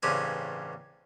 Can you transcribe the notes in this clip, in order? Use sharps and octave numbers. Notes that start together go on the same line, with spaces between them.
A1 G2 C#3 G3 C4 G#5